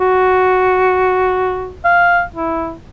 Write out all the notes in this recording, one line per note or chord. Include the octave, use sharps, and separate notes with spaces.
F#4
F5
E4